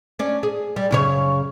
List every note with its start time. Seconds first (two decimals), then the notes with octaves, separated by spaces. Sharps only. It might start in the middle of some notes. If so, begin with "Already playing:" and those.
0.19 C#4 D4
0.43 G#4
0.76 G3
0.91 F#2 C#3 C#5